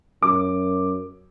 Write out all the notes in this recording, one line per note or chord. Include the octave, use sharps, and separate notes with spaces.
F#2 D6